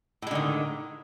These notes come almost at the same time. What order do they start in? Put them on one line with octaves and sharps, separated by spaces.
A2 G#3 D3 D#3